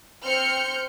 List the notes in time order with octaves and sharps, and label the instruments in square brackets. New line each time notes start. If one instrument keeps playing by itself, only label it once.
[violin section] C4 F6 G6 C#7